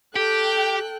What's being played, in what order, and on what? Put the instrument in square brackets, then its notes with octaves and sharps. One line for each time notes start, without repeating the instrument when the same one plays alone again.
[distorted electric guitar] G4 [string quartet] A4 G5 F#6